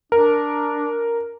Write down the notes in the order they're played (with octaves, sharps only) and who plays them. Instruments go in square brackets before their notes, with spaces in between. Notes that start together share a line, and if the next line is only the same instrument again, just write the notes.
[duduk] D4 [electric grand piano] A#4